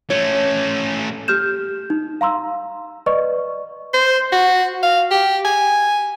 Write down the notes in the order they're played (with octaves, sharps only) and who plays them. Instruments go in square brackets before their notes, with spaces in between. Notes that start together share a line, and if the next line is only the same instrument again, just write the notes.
[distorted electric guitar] A3 C#4 [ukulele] C#5
[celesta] G4 F6 G6 E7
D#4
F5 A#5 C6 E6
B4 D5 D#5 C#6
[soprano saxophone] C5
F#4
F5
G4
G#5